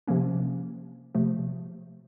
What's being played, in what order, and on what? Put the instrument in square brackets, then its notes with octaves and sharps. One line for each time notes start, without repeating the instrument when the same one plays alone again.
[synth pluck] C3 F3 A#3 C#4
C3 F3 A3